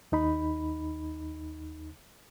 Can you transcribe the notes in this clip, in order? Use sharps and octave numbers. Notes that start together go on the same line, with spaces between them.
D#2 D#4 B5